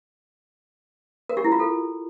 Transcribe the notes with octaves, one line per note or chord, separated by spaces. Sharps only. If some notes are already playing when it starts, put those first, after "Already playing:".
A#4
G4
E4
F4
A4